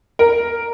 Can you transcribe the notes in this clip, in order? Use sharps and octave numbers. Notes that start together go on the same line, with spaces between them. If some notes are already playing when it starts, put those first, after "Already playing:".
A#4